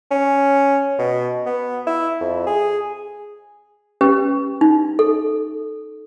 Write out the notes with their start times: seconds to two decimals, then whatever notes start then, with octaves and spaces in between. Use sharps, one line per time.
0.11 C#4
0.98 B2
1.46 B3
1.87 E4
2.20 F2
2.47 G#4
4.01 C#4 G4 B4
4.61 D#4
4.99 A4